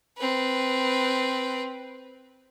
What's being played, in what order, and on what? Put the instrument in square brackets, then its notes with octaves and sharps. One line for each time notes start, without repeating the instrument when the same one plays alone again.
[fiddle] C4 B4